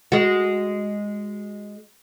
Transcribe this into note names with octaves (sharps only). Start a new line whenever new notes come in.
G#3 F#4